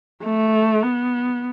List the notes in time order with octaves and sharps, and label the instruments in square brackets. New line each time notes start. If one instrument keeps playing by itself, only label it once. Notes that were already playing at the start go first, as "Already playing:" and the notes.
[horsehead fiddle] A3
B3